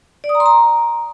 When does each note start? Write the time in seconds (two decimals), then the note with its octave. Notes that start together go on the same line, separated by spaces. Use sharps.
0.24 D5
0.29 D#6
0.35 A#5
0.40 C6
0.46 A#5